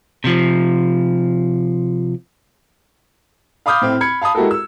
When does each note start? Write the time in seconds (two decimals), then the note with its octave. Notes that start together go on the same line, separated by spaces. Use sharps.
0.24 C3 F3
3.66 F5 B5 D6 D#6 F6 G6
3.82 A2 C4 E4
4.01 B5 G#6 C#7
4.22 F5 A5 B5 D#6
4.35 G#3 E4 F#4 G4 A4 A#4
4.51 E6